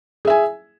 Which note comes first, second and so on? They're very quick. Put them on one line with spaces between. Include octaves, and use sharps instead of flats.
G#4 E5 G#5